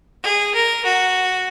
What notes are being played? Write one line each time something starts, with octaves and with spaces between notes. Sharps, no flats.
G#4
A#4
F#4